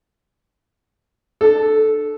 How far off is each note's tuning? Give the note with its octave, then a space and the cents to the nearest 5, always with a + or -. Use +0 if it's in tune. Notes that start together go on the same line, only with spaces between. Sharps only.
D4 +35 A4 -10